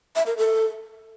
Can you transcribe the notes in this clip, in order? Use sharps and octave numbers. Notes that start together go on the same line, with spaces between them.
E5
A#4
A4